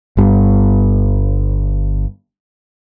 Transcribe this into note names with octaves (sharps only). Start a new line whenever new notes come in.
G1 G2